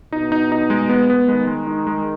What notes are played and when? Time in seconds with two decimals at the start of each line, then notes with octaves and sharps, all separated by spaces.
0.12 B2 D#4
0.32 D#4
0.52 D#4
0.70 G#3
0.89 B3
1.10 B3
1.28 D#3 G#3
1.47 G#3
1.67 D#4
1.87 G#3